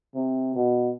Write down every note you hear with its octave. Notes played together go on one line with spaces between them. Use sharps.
C3
B2